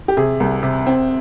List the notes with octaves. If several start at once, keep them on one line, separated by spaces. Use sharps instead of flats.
G4
C3 G#4
C2
C3
C4